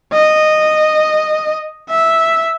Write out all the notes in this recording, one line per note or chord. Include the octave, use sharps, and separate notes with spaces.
D#5
E5